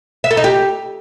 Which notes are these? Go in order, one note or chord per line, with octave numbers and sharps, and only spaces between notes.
E5
A4
D#4
G4